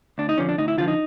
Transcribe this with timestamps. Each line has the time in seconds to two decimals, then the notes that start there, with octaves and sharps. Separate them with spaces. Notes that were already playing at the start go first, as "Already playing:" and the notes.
0.18 D2 D4
0.29 D#4
0.38 D3 F3 C#4
0.49 D4
0.58 D2 D#4
0.68 E4
0.78 D3 F3 F4
0.88 D#4